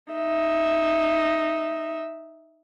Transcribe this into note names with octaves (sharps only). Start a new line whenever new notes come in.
D#4 E5